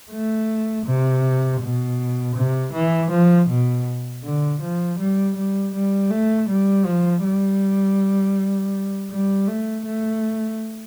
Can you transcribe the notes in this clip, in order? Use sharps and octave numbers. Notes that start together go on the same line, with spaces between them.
A3
C3
B2
C3
E3
F3
B2
D3
F3
G3
G3
G3
A3
G3
F3
G3
G3
A3
A3